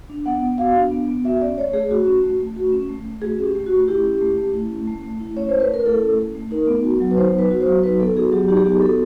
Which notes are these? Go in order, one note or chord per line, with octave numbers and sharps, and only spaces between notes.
D4
B3 F#5
B3
F#4 F5
D4
B3
B3
F#4 E5
C#4 D5
A3 C#5
A3 G#4
F#4
C#4
A3
A3
F#4
C#4
A3
A3
F#4 G#4
C#4
G4
A3
F#4
A3
E4 G4
C#4
A3
A3
E4
C#4
A3
A3
E4
C#4 C#5
A3 C5
B4
A3 A#4
E4 A4
C#4
A3
A3
D#4 A#4
B3
F#4
F#3
B4
D#4 C5
B3 B4
F#4
C5
F#3
D#4 B4
B3 A4
F#4 G#4
F#3 G4
D#4 G4
G#4
B3 G4
F#4 A4